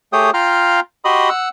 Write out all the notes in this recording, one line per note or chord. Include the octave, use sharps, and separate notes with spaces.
A3 G4 G#4 C#5 G5 D#6
F4 F5 G5 A#5 F6
F#4 G4 D#5 B5 C6 D#6
F#5 E6